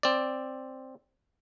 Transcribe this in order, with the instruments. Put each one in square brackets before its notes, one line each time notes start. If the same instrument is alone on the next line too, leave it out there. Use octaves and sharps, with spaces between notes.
[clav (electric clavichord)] C4 D5